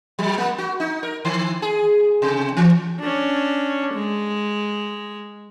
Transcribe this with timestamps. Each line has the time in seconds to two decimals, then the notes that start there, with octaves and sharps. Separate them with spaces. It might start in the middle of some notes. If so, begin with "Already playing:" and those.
0.19 F#3
0.38 A#3
0.58 F#4
0.80 D#4
1.03 A#4
1.25 D#3
1.62 G#4
2.22 C3
2.57 E3
3.00 C#4 D4
3.94 G#3